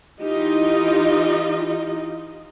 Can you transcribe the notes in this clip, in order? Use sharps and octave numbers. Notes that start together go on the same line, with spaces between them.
E3 D#4 F4 G4 D#5